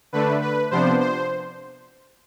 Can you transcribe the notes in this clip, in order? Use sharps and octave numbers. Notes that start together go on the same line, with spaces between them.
D3 A3 D4 B4
B4
C3 F3 B3 D4 C5
C5